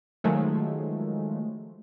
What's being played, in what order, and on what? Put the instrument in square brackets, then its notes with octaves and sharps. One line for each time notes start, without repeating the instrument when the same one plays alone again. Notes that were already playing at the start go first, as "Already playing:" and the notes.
[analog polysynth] D#3 F3 F#3 G#3 A3